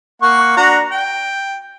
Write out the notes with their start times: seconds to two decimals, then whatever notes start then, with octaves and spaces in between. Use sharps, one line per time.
0.22 A#3 F#5 C#6
0.57 D4 F#4 A#5
0.92 G5